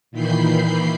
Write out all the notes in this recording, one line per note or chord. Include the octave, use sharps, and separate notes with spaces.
A#2 D#3 E3 B5 G6 C7